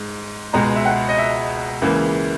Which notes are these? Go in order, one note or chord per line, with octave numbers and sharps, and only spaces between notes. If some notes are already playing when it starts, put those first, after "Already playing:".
Already playing: G#2
C#2 B2 G#3 A#5
E5
F#5
D#5
E5
C#2 C#3 E3 A#3